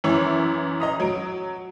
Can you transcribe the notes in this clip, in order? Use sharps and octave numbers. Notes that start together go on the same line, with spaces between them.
F#2 E3 E4 C#5
D#5 A#5 D#6
F#3 D7